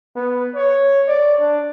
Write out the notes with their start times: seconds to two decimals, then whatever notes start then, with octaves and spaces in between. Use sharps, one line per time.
0.16 B3
0.55 C#5
1.08 D5
1.40 D4